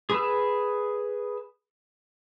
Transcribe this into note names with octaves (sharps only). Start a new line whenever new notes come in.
G#4 B4 E6